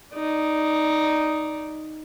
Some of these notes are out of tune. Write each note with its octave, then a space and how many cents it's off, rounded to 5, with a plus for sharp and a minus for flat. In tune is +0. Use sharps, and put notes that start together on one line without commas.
D#4 +0 D5 +0